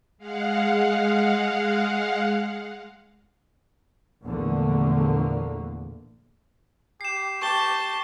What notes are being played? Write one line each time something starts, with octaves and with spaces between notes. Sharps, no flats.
G#3 F5 F#5
A#1 E2 D3 A3 A#3
G4 C7 E7
G4 A5 C#6 G7